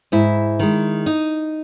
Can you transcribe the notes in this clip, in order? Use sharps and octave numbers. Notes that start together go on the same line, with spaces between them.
G#2 E4
D#3 G#3
D#4